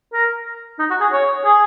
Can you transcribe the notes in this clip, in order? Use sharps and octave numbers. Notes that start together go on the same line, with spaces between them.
A#4
D#4
F#4
G#4
C#5
G#4